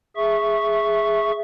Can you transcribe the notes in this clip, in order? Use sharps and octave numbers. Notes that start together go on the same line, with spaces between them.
G#4 E5 C#6